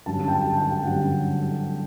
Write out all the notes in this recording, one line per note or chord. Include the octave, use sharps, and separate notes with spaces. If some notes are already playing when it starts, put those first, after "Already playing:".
G2 D3 F#3 C#4 A5
G5
A5
G5
G2 D3 F#3 C#4 F#5